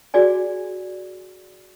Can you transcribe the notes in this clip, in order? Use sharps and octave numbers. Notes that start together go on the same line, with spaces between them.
F#4 G#4 D5 G#5